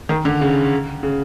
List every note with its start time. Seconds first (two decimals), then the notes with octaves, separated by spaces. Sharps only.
0.09 D#3
0.25 D3
0.41 C#3
1.03 C#3